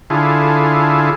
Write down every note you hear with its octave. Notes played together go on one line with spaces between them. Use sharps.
D3 E4 F4 G#4 A4